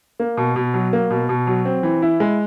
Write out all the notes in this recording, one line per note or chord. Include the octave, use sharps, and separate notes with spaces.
A#3
B2
B2
F#3
A#3
B2
B2
F#3
C4
E3
E4
G#3